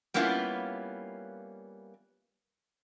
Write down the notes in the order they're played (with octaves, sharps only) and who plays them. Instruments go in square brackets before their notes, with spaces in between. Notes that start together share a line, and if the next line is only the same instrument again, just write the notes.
[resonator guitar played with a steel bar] G3 A#3 B3 C#4 E4 F4